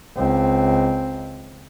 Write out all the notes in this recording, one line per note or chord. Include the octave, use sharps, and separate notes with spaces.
C#2 C4